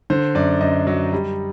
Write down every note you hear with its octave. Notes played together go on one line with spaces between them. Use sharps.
D3 C5
F#2 D5
F#2 D#5
F#3
G3